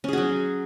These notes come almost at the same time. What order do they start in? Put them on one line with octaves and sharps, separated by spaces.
C#4 G#4 F#4 F#3